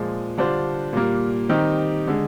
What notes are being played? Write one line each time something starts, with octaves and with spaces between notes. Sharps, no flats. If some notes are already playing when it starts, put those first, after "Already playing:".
Already playing: A#2 F3 G#3
D3 G3 D4 F4 C5
A#2 G3 A#3
D#3 G3 C4 D#4 G4
D3 G#3